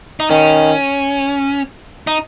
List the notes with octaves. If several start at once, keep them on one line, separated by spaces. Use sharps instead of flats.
D#4
D#3 C#4
D#4